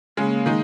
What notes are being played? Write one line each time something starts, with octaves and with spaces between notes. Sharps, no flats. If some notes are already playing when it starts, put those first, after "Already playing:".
C#3 G#3 A#3 C#4
D#3 G#3 D#4